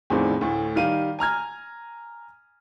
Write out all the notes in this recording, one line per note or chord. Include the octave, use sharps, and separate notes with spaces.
E2 A2 D#3 F3 C4 D4
D2 A2
D#3 G3 F5 D#7
G#5 A#5 F6 G#6